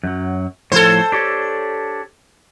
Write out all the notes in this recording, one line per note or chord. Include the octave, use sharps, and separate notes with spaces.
F#2 F#3
A2 F3 A4 C5 C#5
D4 G4 C#5